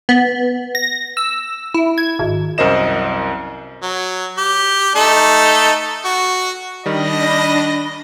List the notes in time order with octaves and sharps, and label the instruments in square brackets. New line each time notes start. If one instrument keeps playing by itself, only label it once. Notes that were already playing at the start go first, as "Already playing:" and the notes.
[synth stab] B3
A#6
E6
E4
G#6
G#1
[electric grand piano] C2 F#2 A#4 C5 D#5 E7
[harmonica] F#3
G4
A3 D#4 A4
F#4
[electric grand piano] D#3 G3 [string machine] D4 A#6 [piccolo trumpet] D#5 [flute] B5